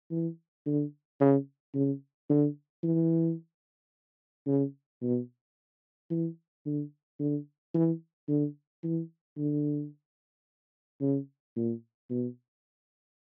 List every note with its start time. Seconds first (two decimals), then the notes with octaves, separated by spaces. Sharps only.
0.11 E3
0.66 D3
1.20 C#3
1.75 C#3
2.30 D3
2.83 E3
4.47 C#3
5.02 B2
6.10 E3
6.66 D3
7.20 D3
7.74 E3
8.28 D3
8.83 E3
9.37 D3
11.01 C#3
11.56 A#2
12.10 B2